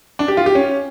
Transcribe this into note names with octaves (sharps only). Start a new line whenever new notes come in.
D4
G4
F4
G4
C#4